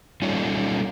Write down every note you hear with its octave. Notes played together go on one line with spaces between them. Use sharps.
G3 A3 C#4 D#4 F4